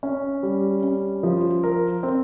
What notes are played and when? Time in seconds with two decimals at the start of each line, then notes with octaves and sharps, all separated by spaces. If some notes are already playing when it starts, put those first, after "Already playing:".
0.03 C#4
0.43 G3
0.83 C#4
1.23 F3
1.63 A#4
2.03 C4